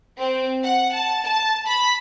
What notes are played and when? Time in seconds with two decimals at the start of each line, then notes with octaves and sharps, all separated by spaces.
0.18 C4
0.64 F#5
0.93 A5
1.24 A5
1.66 B5